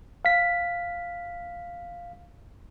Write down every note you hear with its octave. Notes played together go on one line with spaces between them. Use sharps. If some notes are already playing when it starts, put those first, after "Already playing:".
F5 B6